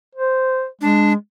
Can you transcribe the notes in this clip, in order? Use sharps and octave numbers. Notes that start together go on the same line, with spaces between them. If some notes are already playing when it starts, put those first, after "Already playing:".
C5
G#3 D4